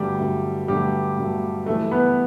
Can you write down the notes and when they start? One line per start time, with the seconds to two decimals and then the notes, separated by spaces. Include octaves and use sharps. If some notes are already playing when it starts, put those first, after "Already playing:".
Already playing: G1 G2 F#3 G3 A3 G4
0.19 G1 G2 F#3 A3
0.68 G1 G2 F#3 G3 A3 G4
1.17 G1 G2 F#3 A3
1.66 F#1 F#2 E3 G3 A3 A4
1.91 B3 B4